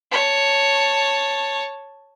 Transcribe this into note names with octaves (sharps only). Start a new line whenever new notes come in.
C#5 A5